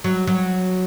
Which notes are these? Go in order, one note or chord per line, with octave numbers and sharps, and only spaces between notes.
F#3
F#3